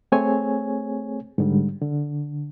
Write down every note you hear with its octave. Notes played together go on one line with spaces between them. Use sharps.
A3 C4 G#4 C#5 G#5
G#2 D3 G3
D3